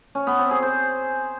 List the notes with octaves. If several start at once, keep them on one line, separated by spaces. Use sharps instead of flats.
C#4
B3
C4
G#4
C5